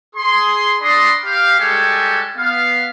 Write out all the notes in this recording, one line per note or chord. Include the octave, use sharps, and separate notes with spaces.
G#4 C6
D4 D5 D#5 B5 C6
G4 F5
G3 G#3 F#4 G4 A4 G#5
B3 F5